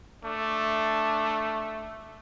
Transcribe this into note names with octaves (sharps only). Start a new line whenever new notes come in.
A3 D4